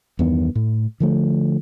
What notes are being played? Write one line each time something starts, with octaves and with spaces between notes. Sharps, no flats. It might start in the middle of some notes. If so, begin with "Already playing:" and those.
E2 G2 D#3 B3
A2
D3 F3 A3